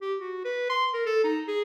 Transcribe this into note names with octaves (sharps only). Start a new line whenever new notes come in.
G4
F#4
B4
C6
A#4
A4
D#4
G#4